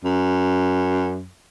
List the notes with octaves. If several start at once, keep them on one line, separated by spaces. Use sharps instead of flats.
F#2